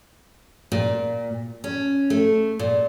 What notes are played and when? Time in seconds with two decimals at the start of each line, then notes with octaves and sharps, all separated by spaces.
0.72 A#2
1.64 C#4
2.10 A3
2.59 A#2